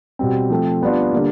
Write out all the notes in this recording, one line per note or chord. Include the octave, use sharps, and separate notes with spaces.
B2 G3 C4
F3 A3 C4
G3 B3 D4 F4
D3 G3 A#3